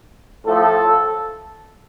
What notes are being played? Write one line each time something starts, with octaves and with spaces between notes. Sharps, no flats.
A2 F3 A3 A4